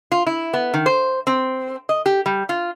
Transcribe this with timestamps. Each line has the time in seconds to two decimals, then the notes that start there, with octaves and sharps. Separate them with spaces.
0.12 F4
0.27 E4
0.54 B3
0.74 D#3
0.86 C5
1.27 C4
1.89 D#5
2.06 G4
2.26 G3
2.49 F4